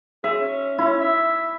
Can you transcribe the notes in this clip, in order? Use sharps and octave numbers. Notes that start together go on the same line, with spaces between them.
G#4 E5
C#4
C#4 E4
E5